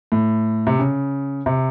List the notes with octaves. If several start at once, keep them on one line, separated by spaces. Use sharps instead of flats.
A2
C3
C#3
C3